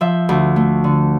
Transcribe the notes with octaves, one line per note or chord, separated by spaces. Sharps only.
F3 E5
D2
A3
D3